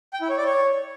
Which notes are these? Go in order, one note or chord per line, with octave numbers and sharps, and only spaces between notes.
G5
E4
C#5
D5
C#5